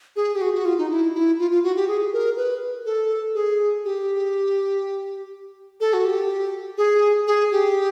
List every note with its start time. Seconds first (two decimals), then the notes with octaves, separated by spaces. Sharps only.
0.16 G#4
0.35 G4
0.41 F#4
0.54 F#4
0.65 F4
0.78 D#4
0.90 E4
1.15 E4
1.39 F4
1.51 F4
1.64 F#4
1.76 G4
1.88 G#4
2.13 A#4
2.37 B4
2.86 A4
3.35 G#4
3.84 G4
5.80 A4
5.93 F#4
6.05 G4
6.78 G#4
7.27 G#4
7.52 G4